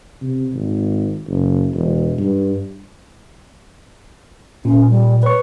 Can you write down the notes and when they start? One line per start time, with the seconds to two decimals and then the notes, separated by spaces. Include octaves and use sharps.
0.22 C3
0.54 G#1
1.28 F#1
1.74 E1
2.19 G2
4.65 A#2 C#4
4.90 G3
5.23 B4 C#5 C#6